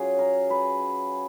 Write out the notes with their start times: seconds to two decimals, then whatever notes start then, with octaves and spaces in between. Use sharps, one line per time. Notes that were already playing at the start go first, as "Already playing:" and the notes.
Already playing: F#3 C#4 F4 G#4
0.19 A#4
0.50 B4